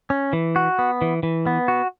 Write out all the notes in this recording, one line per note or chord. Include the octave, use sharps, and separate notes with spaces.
C#4
E3
F#4
B3
E3
E3
B3
F#4